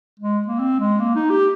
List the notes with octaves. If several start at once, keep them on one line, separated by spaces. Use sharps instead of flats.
G#3
A#3
C4
G#3
A#3
D#4
G4